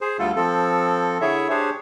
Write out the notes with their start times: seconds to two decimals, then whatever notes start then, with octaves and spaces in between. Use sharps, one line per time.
0.01 G#4 C5
0.19 D2 D3 G3 A3 F4 A4
0.36 F3 C4 A4
1.21 D3 E4 G#4 C#5 E5
1.50 D4 G4 G#4 C5 C#5